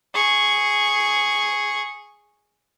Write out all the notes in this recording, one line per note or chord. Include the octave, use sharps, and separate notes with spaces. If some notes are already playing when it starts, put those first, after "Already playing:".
G#4 C#6